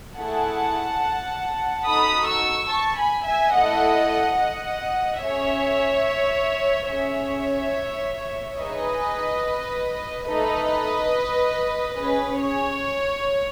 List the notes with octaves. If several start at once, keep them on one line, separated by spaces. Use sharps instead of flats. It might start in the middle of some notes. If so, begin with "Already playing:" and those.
A3 E4 G#4 F#5 A5
D#4 F#4 A4 B5 D#6
C#6 E6
A5 C#6
G#5 B5
E5 G#5
A3 E4 A4 D#5 F#5
D#5 F#5
C#4 G#4 C#5 E5
C#4 G#4 C#5 E5
D#4 G#4 B4 D#5
A3 D#4 A4 B4 D#5
C#4 G#4 B4
C#5